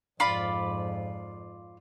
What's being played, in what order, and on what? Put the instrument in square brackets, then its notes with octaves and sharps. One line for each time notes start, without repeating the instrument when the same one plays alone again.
[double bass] F2 G#2 [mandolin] F4 D5 B5